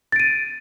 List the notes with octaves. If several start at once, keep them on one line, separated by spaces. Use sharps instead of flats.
A6 D7 D#7